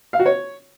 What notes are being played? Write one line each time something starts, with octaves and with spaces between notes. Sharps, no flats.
F5
F#4
C#5